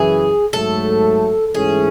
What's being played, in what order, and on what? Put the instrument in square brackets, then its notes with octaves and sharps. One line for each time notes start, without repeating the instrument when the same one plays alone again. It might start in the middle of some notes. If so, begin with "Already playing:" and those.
Already playing: [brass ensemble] F#2 C#3 E3 [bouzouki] G#4
[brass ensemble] G#2 F#3 A3 [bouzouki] A4
[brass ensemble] G#2 E3 A3 C#4 [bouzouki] G#4